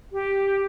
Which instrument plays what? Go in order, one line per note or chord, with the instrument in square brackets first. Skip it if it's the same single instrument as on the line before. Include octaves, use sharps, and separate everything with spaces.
[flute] G4